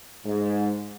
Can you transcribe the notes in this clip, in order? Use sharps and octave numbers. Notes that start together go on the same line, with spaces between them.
G#2